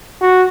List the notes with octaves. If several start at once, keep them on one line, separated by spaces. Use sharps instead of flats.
F#4